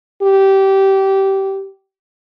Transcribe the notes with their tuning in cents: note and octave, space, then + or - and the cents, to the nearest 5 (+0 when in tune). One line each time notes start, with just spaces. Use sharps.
G4 -20